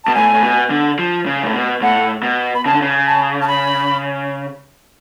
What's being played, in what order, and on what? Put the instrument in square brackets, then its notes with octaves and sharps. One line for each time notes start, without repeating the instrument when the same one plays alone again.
[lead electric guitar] B2 [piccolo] A5
[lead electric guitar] A2 [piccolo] G#5
[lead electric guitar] A2
B2
D3
F3
C#3
A2
B2
[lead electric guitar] A2 [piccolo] F#5
[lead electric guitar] B2
[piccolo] B5
[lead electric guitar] C#3 [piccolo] A5
[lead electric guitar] D3
C#3
[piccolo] A5
A5
B5